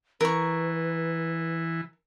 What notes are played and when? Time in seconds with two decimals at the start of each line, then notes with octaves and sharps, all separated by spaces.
0.21 E3 A#4 B4 C#6